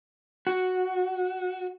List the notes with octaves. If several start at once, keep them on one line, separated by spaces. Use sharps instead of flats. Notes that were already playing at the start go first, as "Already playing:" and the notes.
F#4